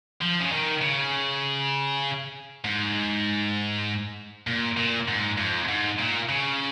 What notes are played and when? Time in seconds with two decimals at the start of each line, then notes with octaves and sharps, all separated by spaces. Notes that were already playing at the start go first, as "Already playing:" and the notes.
0.21 F3
0.40 C#3
0.52 D#3
0.82 C#3
2.65 G#2
4.47 A#2
4.77 A#2
5.08 G#2
5.38 F2
5.68 G#2
5.99 A#2
6.29 C#3